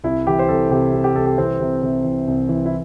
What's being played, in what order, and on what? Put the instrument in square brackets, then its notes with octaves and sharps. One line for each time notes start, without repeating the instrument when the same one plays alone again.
[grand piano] C2 E4
E3 G4
C5
C2 A4
C3 G4
C3
G4
C2 A4
G4
E3 C4
C3
C3
E3
C2
E3
E4